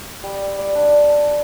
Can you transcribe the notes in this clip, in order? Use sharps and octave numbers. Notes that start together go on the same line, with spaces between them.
G3
D5
D4
A5